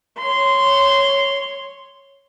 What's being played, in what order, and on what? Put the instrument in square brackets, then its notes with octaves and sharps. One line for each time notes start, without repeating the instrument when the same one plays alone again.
[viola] C#5 C6